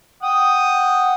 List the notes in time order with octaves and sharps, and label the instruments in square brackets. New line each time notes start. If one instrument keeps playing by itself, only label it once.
[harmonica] F#5 G5 D#6